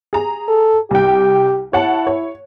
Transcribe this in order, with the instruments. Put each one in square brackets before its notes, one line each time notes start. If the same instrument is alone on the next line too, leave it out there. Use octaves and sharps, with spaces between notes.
[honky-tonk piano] G#4 A#5
[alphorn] A4
[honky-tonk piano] C2 G5 [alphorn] G4
[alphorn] E4 [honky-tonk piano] C#5 F#5 A5
[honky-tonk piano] C#5